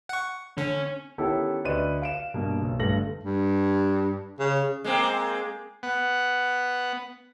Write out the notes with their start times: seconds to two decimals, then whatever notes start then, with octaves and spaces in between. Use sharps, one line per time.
0.09 F#5 C#6
0.58 D3 C#4
1.18 D#3 B3 C#4 E4 G4 A4
1.65 D2 B4 D5 D#5 D#7
2.02 F5 D7 E7
2.34 G2 B2 A#3
2.61 B1
2.79 G1 G2 A3 A#6 F#7
3.23 G2
4.39 C#3
4.84 G#3 A#3 C4
5.83 B3 F#5